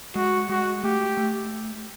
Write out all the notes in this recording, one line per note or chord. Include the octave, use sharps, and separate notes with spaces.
G#3 F#4
G#3 F#4
A3 G4
A3